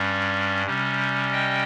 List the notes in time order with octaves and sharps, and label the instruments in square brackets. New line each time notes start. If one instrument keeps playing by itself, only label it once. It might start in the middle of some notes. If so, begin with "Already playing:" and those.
Already playing: [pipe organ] G2 G3 C#4
C3 G3 C#4
D#5 G5